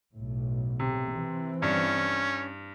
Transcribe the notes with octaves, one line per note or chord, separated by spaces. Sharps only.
B1 A2
C3
E3 C4
G2 C#4